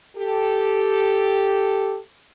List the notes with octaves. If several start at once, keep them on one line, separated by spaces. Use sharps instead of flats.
G4 A4